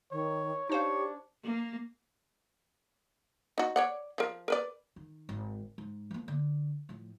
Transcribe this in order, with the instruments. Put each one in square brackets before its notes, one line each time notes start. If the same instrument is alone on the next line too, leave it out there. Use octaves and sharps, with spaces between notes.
[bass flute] D#3 [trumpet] C#5
[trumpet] D4 [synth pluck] D#4 C5 F5 [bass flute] G4 [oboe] C#5
[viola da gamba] A#3
[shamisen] D#4 F#4
C#5 D5 F#5
F3 A#4
A#4 B4 D5
[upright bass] D#3
G#1
G#2
F3 A#3
D3
A2 F3